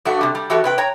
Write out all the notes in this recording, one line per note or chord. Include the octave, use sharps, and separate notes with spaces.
G2 A3 F#4
C3 G3
G3
E3 A3 F#4 G4
C3 B4 G5
C#5 G5 A#5